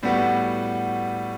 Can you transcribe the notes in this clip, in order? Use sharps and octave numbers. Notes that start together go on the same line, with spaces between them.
A2 G3 B3 F#4